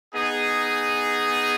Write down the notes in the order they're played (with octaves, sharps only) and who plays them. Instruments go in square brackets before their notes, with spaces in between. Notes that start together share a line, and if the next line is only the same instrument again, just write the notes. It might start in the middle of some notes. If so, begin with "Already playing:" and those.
[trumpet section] B3 D#4 G#4